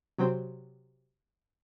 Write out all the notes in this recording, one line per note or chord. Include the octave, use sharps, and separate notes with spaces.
C3 F#3 C4